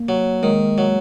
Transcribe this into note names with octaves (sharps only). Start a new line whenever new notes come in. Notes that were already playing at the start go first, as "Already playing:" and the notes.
Already playing: A#3
F#3
D#3 G#3
F#3